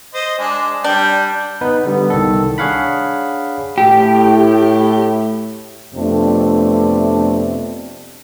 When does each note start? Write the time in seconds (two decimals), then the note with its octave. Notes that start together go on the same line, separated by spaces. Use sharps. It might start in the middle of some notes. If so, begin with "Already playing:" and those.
0.14 C5 D#5
0.39 G#3 D4
0.84 G3 D4 G5
1.61 B3 D#4 B4
1.85 D3 G3 B3
2.10 C2 D#3 A4
2.58 D4 G#4 C#5 F5 F#5 B5
3.78 A2 G4
5.95 F2 C3 A3 B3 D4